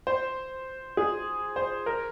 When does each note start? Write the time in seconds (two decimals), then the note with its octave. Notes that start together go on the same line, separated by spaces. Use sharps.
0.07 C5
0.97 G#4
1.56 C5
1.86 A#4